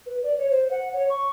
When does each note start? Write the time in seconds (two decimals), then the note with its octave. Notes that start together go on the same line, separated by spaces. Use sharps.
0.06 B4
0.23 D5
0.37 C#5
0.51 C5
0.71 F#5
0.93 C#5
1.10 C#6